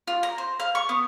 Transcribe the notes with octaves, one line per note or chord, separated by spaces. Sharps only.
F4
A#5
C5
F5
C#6
B3